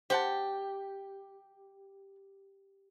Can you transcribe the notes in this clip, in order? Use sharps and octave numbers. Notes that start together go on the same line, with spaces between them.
G4 C5 F#5 A5